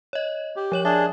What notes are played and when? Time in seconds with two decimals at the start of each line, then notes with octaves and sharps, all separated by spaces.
0.13 C#5 D#5
0.56 G4
0.72 F3 C#5 F#7
0.85 D4 G#4 E5 A5